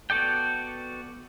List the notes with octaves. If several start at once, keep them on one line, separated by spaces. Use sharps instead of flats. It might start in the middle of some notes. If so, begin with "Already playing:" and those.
B3 F#4 A4 D5 G5